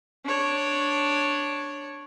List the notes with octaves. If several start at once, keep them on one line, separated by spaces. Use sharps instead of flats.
D4 C#5